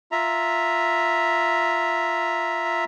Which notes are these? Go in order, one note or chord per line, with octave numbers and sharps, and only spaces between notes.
F4 E5 A#5